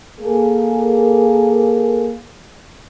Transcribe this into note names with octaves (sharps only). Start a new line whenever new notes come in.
A#3 G#4 A4